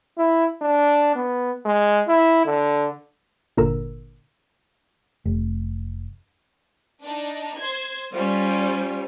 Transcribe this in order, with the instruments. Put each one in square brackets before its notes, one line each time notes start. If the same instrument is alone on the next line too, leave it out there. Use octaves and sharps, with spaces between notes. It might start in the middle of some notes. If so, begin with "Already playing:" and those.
[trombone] E4
D4
B3
G#3
E4
D3
[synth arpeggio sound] G1 A#2 D3 A#4 A#5 E6
[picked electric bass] F1
[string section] D4 D#4
C5 G#6
[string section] G3 [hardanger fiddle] C#4 F4 [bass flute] C5